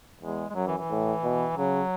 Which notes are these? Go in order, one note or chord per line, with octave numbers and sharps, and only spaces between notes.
E2 G#3
G#3
F#2 F#3
E3
E3
A2
B2
C#3 F#3